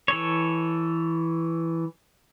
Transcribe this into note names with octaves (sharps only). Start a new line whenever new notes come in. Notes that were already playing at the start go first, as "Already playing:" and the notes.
E3 A4 C#5